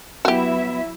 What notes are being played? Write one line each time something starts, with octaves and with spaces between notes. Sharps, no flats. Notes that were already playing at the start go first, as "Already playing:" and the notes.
F#3 B3 E4 F#4 G4 E5